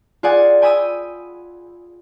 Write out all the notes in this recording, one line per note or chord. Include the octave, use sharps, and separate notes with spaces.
F4 G#4 D5 F#5 G#5
G5 G#5 B5 D#6 E6 D#7